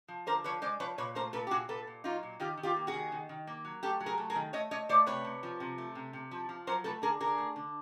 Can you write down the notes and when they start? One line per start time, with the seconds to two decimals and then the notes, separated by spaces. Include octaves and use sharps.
0.08 F3
0.26 D3 A#4 C5
0.44 F3 B4 C#5
0.62 G#3 C5 D5
0.80 F3 B4 C#5
0.98 A#2 B4 C#5
1.15 A3 A#4 C5
1.33 A#2 A4 B4
1.47 G4
1.51 A#2 F#4 G#4
1.68 A#2 A4 B4
1.87 A#2
2.04 F#3 D#4 F4
2.23 A#2
2.40 D#3 F4 G4
2.57 D#3
2.63 F4 G4
2.76 A#3
2.87 F#4 G#4
2.93 D#3
3.12 D#3
3.29 D#3
3.47 A#3
3.65 F#3
3.83 A3 G4 A4
4.00 F#3
4.06 G#4 A#4
4.18 A3
4.30 G#4 A#4
4.35 D#3
4.53 A3 C#5 D#5
4.71 A3 C#5 D#5
4.89 A3 C5 D5
5.06 C3 B4 C#5
5.25 C3
5.43 F3
5.60 C3
5.78 A3
5.95 C3
6.13 C3
6.31 F3
6.49 F3
6.67 F#3 A#4 C5
6.84 A3 A4 B4
7.02 D3 G#4 A#4
7.20 D3 G#4 A#4
7.38 A3
7.56 D3